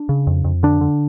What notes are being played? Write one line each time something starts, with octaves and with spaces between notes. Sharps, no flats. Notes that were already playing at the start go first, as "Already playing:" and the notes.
Already playing: D4
C#3
F2
F2
D3 D4
D3